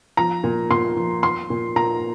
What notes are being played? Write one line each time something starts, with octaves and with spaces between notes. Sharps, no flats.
F3 A#5
A#2
A#2 C6
F3
F3 C6
A#2
A#2 A#5